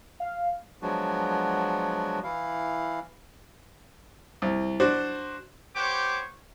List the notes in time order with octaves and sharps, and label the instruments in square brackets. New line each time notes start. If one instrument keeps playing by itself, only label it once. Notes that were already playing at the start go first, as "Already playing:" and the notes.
[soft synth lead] F5
[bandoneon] F3 F#3 G#3 B3 D4 F#4
E3 E4 F5
[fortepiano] C2
D4 F#4 C5 D5
[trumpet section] B3 G4 C5 C#5 C#6 D6